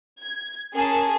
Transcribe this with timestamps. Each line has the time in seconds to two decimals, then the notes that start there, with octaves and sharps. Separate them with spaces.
0.20 G#6
0.75 C#4 G#4 A#4 A5